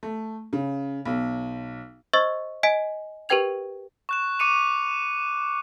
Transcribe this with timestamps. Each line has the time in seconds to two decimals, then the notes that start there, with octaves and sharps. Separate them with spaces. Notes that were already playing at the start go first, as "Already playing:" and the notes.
0.03 A3
0.53 C#3
1.05 B1
2.13 C5 D#5 C#6 E6 A6
2.63 D#5 G#5 B6 D7
3.29 G4 A#4 B4 G5 G#6 F7
4.09 C#6 F#6 E7
4.39 C#6 D6 C#7 D#7 F7